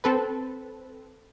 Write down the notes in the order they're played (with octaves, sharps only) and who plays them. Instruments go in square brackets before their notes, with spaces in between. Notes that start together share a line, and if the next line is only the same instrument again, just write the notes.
[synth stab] C4 A4 B4